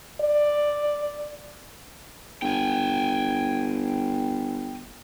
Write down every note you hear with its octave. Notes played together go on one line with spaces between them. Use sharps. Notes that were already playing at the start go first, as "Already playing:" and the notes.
D5
G1 G5 G#5